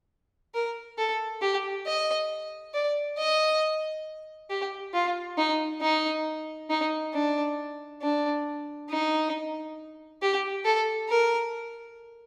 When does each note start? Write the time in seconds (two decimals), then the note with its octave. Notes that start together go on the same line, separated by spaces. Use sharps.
0.54 A#4
0.98 A4
1.42 G4
1.86 D#5
2.74 D5
3.18 D#5
4.50 G4
4.94 F4
5.38 D#4
5.81 D#4
6.70 D#4
7.14 D4
8.02 D4
8.90 D#4
10.22 G4
10.65 A4
11.09 A#4